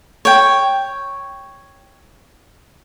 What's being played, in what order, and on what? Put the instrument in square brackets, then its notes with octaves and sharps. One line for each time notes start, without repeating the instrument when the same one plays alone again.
[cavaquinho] C#5 G5